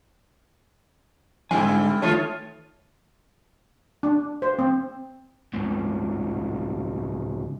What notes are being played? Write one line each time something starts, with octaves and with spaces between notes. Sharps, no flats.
G#2 D3 G3 C4 E4 G#5
D#3 A3 F4 C#5
D4
C5
C4
C#2 G2